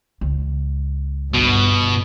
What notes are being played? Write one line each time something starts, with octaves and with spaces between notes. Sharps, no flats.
C#2
G1 B2